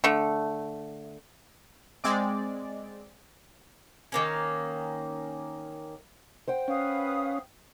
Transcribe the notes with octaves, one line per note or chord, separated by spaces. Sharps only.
D3 A3
G#3 C4 D5
D#3 A#3 C#4
C5 F#5 G5
C#4 B4 F5 D#6